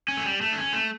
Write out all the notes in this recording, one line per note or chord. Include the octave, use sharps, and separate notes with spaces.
C#4
A3
G3
A3
D4
C#4
A3